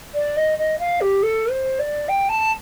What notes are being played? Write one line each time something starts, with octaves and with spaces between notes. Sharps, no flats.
D5
D#5
D#5
F5
G4
A4
C5
D5
G5
A5